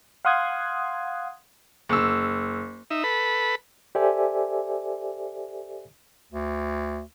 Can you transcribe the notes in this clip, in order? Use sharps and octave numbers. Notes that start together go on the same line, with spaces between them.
F5 F#5 C6 D#6 F#6 G#6
F#1 E6
D#4 E5
A4 B4 B5
G4 A4 C5 D5 E5 G#5
D2